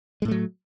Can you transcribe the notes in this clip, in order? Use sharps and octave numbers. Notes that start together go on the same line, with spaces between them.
A2 F#3 G#3 A3